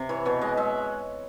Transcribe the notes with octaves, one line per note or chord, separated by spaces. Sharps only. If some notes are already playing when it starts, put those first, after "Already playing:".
Already playing: C3
E3 C#5
B2 C#5
G#3 D#5
G#3 E5